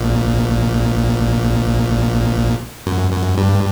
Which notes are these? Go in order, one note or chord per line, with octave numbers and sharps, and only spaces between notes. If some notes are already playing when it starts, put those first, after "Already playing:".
Already playing: A#1 A#2
F#2
F#2
G2